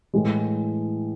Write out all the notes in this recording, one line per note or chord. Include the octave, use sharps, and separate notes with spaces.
A2 E3 G#3